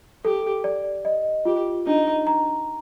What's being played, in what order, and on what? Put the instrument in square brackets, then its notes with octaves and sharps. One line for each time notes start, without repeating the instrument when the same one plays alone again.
[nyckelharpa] G4 [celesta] A4
[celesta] D5
D#5
[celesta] F4 [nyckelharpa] G4
[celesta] D4 [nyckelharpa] D#4
[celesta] A#5